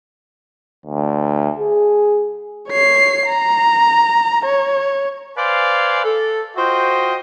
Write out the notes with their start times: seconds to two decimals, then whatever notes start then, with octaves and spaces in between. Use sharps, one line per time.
0.86 D2
1.59 G#4
2.69 C#5 C7
3.26 A#5
4.46 C#5
5.37 B4 C5 D5 F5 G#5
6.04 A4
6.56 F4 F#4 C5 D#5 G5